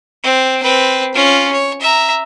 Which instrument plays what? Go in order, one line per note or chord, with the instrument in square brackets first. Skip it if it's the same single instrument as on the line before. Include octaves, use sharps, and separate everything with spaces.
[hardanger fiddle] C4
C4 B4
C#4 F4
C#5
E5 A#5